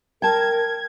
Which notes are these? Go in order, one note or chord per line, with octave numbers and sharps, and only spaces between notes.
A#4 G5 A5 G#6